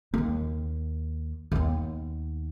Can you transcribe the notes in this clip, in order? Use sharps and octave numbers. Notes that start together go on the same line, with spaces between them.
D#2 A#3
D#2 B3